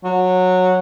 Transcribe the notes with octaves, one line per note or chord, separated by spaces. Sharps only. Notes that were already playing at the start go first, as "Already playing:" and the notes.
F#3